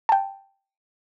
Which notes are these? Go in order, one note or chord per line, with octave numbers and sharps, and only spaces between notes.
G5 A5